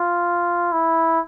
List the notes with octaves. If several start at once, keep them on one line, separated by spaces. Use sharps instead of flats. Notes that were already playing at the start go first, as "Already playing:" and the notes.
Already playing: F4
E4